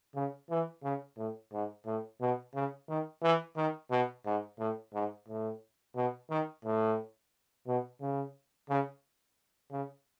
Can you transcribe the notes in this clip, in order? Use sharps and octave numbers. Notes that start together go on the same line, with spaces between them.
C#3
E3
C#3
A2
G#2
A2
B2
C#3
D#3
E3
D#3
B2
G#2
A2
G#2
A2
B2
D#3
A2
B2
C#3
C#3
C#3